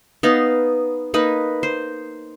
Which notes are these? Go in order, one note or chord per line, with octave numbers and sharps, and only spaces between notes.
B3 D#4 F5
A#3 D#4 B4
C5